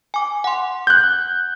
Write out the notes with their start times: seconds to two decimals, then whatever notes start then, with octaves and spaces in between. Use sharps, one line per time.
0.14 G#5 D6
0.44 F#5 C6
0.87 F#6 G6